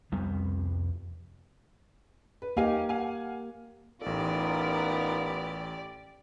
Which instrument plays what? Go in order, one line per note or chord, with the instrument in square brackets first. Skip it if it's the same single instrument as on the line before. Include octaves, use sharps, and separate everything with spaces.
[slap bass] C2 F2 G3 B3
[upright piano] B4
[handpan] A#3 G4 [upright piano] D#4 F5 G#5
[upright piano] F5 F#5 G#5
[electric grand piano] A1 A4 [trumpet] B3 [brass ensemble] D#4 F4 A#4 [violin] G4 D5